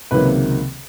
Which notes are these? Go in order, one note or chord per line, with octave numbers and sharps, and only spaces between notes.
C#2 C3 D#3 F#3 A#3 B4